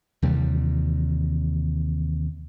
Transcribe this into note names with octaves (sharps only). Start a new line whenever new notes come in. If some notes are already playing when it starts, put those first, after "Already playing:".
D#2 C3 E3 G3